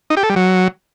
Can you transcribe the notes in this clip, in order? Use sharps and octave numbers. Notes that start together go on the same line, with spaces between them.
D#4
G4
A4
G3
F#3